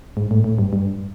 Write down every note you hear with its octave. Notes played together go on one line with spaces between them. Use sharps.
G#2
A2
A2
G2
G2